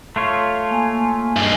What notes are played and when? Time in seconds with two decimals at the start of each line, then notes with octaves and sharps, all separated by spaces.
0.16 A3 F4 C#5
0.71 A#3 G#5
1.37 G2 G#3